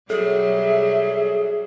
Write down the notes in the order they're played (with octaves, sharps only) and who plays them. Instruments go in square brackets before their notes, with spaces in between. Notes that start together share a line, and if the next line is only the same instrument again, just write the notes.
[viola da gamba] B2 F#3 G3 [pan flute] G#4 [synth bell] A4 [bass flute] E5